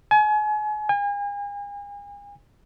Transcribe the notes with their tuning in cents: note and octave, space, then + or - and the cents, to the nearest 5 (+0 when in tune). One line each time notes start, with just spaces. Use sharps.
G#5 +35
G#5 -40